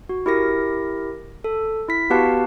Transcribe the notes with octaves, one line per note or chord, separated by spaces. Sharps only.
F#4
E4 G4 A#4 A#6
A4
E4 B6
B3 F#4 G4 B4 F5 A5